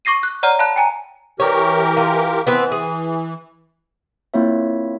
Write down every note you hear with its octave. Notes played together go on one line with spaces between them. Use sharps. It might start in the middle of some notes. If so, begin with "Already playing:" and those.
C#6 D6 A#6 C7 D#7
F#6
C#5 D5 F#5 A#5 F6
F5 A5 B5 F#6
G5 G#5 A#5
E3 G4 A#4 C#5
F4
E3 B3 C4 B4
G#4
A#3 C4 E4 F4 C#5 E5